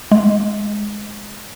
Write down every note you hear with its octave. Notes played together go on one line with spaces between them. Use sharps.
G#3